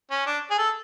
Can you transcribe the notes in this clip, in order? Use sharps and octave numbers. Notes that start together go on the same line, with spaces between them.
C#4
D4
G#4
A4